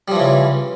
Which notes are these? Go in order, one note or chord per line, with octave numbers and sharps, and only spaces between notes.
C#3 E3 F3 G3